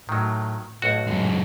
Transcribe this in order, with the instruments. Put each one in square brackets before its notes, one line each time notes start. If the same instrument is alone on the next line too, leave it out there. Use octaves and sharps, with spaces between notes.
[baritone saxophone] A2 [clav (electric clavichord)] D#3 F#3
[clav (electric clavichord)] B1 F#4 [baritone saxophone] A2
[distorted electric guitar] F#2 G#3